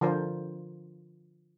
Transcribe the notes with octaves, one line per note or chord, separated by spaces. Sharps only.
D3 F3 F4 A#4 C5